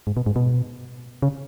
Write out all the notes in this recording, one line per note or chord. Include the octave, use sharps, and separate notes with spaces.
G#2
B2
G#2
B2
C#3